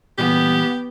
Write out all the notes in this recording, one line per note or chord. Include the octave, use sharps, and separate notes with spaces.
A#2 E3 G3 B3 G4